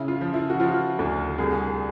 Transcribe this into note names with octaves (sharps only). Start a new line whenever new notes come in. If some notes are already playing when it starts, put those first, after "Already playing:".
Already playing: C#3 E4
F4
F3
E4
F#4
F3 F4
D2
C2 G#4